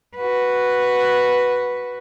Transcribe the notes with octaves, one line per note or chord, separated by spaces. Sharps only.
F#4 B4